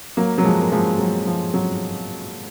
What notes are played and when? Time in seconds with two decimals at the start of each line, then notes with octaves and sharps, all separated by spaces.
0.17 F#3 A#3
0.38 F#3
0.44 F3 G#3
0.62 A#3
0.72 F3 G#3
0.99 F#3
1.27 F3
1.54 F#3